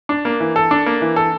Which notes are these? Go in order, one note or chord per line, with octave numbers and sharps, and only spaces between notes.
D4
A#3
E3
A4
D4
A#3
E3
A4